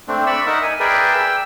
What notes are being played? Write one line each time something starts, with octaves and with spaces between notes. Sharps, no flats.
A3 C4 D4
D5 B5 C#6 E6
D#4 A#4 E5 F#5
G#5
G#4 A#4 B4 D5 E5 G5
G5 E6